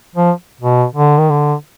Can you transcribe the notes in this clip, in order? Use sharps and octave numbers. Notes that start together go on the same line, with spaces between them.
F3
B2
D3
D#3
D3